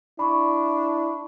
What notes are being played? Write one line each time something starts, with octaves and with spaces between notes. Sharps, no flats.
D4 E4 B5 C#6